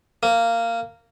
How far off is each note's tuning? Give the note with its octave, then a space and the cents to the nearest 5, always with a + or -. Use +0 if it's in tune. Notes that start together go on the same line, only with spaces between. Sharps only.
A#3 -15